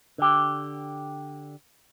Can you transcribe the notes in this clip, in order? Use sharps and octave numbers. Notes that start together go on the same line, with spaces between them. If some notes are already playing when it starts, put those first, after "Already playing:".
D3 G4